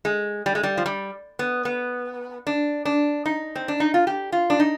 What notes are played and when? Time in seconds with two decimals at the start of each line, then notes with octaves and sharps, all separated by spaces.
0.05 G#3
0.46 G3
0.55 G#3
0.63 G3
0.78 F3
0.86 G3
1.39 B3
1.65 B3
2.47 D4
2.85 D4
3.26 D#4
3.56 C4
3.68 D4
3.80 D#4
3.94 F4
4.07 G4
4.32 F4
4.50 D4
4.60 D#4